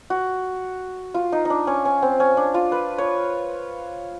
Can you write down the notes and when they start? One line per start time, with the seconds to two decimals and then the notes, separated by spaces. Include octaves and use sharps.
0.10 F#4
1.14 F4
1.32 D#4
1.45 D4 D#4
1.67 C#4
1.85 C#4
2.02 C4
2.20 C#4
2.37 D4
2.54 F4
2.72 B4
2.98 C#5